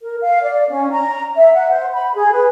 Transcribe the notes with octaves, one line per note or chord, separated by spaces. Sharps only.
A#4
F5
D5
C#4
A#5
E5
F#5
C5
B5
G#4
B4